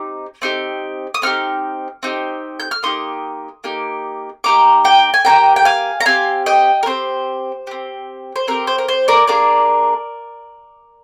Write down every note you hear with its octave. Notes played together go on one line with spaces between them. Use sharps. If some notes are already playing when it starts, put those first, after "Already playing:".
Already playing: C4 D#4 G4
C4 D#4 G4
D#6
C4 D#4 G4 F6
C4 D#4 G4
G6
F6
A#3 D#4 G4 C6 D#6
A#3 D#4 G4
A#3 D#4 G4 A#5 D6
G5 A#5
G#5
A#3 D#4 G4 G5 A#5
G5
F5 G#5
A#5
C4 G4 F5 G#5
D#5 G5
A#4
C4 G4 C5
C4 G4
C5
C4 G4 A#4
C5
A#4
C5
A#4 D5
A#3 D4 G#4 A#4 D5